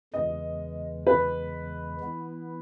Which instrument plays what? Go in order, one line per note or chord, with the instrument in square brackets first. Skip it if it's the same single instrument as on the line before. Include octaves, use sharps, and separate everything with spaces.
[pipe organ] E2 C#3 E3 G#3 [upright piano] D#5
[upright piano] B4
[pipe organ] E3 B3 E4